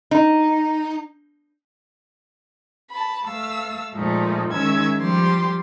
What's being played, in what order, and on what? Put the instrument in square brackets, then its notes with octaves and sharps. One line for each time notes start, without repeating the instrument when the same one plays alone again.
[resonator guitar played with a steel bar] D#4
[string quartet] A5 B5
A3 F5 E6
A#2 F3 G#3 A3 D#4
D#3 G#3 C#4 E5 E6 G#6
F3 G3 G4 C6